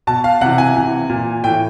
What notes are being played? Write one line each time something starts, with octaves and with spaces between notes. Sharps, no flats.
B2 A5
F5
C3 E3 F#5
G#5
C3 E3
A#2
A2 E3 G5